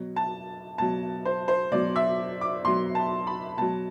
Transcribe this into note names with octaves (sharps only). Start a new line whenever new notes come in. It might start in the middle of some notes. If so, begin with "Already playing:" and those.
Already playing: B2 F#3
A5
B2 F#3 A5
C5
C5
B2 F#3 D5
E5
D6
B2 F#3 C6
A5
B5
B2 F#3 A5